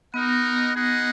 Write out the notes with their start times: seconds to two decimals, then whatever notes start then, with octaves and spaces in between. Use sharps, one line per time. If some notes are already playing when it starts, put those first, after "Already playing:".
0.14 B3 D#4 A#4 D#5 F#5
0.75 D#4 G#4 D#5 F#5